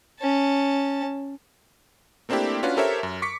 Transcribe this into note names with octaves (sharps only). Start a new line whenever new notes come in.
C#4 A5
A3 A#3 C4 D4 E4 G4
C#4 D4 F4 F#4 B4
G4 A4 A#4 C5 C#5 E5
F#2
C#6 D6 B6 C#7